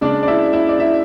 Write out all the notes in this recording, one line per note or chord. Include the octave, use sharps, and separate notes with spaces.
C#3 G#3 D4 D5
D5
E4 E5
E4 E5
D5
E4 E5